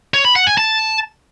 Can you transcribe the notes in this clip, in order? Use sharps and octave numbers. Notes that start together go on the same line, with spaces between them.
C#5
B5
F#5
G#5
A5